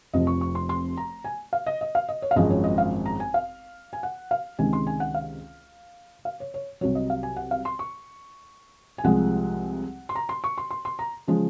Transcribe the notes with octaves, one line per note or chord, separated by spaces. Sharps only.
F1 F2 C3 F3 D#5
C#6
C#6
C6
C6
A#5
G#5
F5
D#5
D#5
F5
D#5
C#5
F5
G#1 F#2 F3 G#3 D#5
C#5
D#5
F5
A#5
G#5
F5
G#5
F#5
F5
C#2 C3 D#3 G#3 G#5
C6
G#5
F#5
F5
F5
C#5
C#5
C2 C3 F#3 C#5
D#5
F5
G#5
F#5
F5
C6
C#6
G#5
C2 C3 F3 G#3 F#5
C6
A#5
C6
C#6
C6
C6
C6
A#5
C#3 F3 G#3